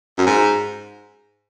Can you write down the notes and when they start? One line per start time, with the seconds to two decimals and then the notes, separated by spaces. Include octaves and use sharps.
0.18 F#2
0.26 G#2